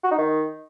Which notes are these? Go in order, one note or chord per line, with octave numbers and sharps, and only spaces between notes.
F#4
D#4
D#3